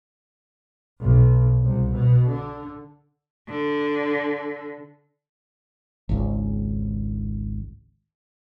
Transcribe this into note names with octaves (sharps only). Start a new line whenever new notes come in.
B1
C2
B2
D3
D3
G#1 C#2